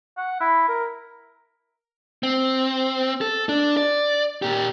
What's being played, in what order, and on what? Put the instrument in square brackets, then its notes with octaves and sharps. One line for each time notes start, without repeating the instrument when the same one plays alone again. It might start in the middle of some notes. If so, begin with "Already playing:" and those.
[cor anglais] F#5
E4
A#4
[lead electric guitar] C4
A4
D4
D5
A#2 G4